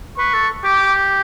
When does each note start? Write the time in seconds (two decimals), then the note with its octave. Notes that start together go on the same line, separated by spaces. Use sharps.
0.18 B4 C#6
0.34 A4
0.64 G4 D6